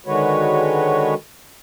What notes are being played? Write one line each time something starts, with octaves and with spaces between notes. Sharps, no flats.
D3 D#3 G#3 F#4 B4 C#5